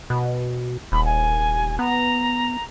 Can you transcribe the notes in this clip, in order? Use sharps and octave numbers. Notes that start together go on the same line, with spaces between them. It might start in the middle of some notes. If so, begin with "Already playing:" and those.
B2
D#1 B5
G#5
B3 A#5